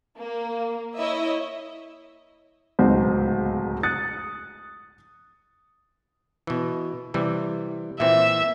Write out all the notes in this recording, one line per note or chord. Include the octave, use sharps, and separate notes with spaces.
A#3
E4 C#5 D#5 E5
D1 C#2 B2 D#4 F#4 C5
D#6 F#6 A6 C#7
B2 E3
C3 E3 G3
A#2 E3 C4 E5